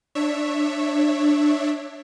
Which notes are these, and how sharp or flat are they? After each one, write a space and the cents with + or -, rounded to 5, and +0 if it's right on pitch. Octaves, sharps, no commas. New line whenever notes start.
D4 +10 C#5 -10 E5 +0